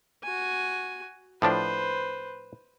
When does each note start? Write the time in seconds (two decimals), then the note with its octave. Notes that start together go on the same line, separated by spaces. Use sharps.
0.23 F#4 G#5
1.42 A2 F3 D4 B4 C5